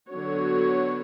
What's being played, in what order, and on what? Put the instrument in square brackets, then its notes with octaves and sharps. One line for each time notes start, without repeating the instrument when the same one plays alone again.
[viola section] D3 F#3 B3 F#4 C#5